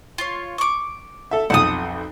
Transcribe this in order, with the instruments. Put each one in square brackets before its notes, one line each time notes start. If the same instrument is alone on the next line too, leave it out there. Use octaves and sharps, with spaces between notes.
[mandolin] F4 C#5
C#6 D6
[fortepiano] A4 E5
[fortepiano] B1 F2 [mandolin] F#5 A5 D#6